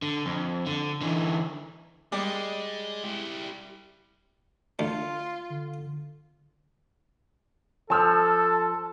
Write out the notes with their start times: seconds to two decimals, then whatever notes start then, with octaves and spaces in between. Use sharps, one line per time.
0.02 D3
0.26 F2
0.66 D3
1.01 D3 E3
2.12 G3 G#3 D5
3.04 E4 G4
4.79 D2 F4
5.50 D3
7.90 F3 A4 A5 E6 F6